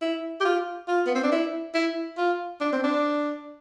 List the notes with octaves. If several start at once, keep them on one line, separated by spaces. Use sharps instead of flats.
E4
G4
F4
F4
B3
C4
D4
E4
E4
F4
D4
C4
D4